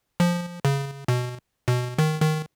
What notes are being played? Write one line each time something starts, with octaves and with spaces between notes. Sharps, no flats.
F3
C#3
B2
B2
D#3
D#3